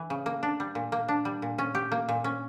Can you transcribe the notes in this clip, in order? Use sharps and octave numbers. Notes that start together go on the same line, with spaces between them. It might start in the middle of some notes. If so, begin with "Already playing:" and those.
Already playing: E3
C#3
A#3
D4
G3
A#2
A#3
D4
G3
A#2
C#4
G4
A#3
A#2
C#4